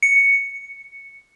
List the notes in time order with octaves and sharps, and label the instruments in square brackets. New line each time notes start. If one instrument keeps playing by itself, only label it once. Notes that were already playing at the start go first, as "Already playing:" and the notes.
[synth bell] C#7